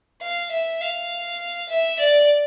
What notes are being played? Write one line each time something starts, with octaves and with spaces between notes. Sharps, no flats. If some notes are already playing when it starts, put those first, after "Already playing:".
F5
E5
F5
E5
D5